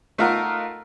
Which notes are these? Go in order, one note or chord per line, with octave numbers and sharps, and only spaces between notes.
A3 D#4 F4 A#4 F#5